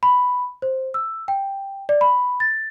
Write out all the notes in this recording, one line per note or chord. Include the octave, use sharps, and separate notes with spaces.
B5
C5
E6
G5
D5
B5
A6